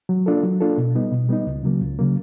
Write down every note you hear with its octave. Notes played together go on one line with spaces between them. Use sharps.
F#3
A#3 D4 F4 A4
F#3
A#3 D4 F4 A4
B2
G3 B3 D#4
B2
G3 B3 D#4
C#2
C#3 F#3 A#3
C#2
C#3 F#3 A#3